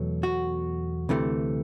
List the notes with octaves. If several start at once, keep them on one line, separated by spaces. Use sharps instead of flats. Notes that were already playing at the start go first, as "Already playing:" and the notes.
Already playing: E2 B2 F#3 A3
F#4
D2 C3 E3 A3